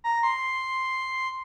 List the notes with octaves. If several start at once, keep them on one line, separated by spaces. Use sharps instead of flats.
A#5
C6